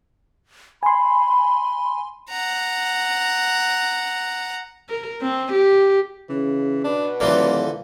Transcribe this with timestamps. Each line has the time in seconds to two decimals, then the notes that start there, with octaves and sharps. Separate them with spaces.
0.83 G#5 B5 C6
2.30 F#5 A#5
4.89 A#4
5.22 C4
5.52 G4
6.29 C#3 E3
6.84 B2 D4 B4
7.20 D#1 D3 E3 F3 A#3